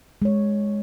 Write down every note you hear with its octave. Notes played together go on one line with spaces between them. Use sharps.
G#3 C#5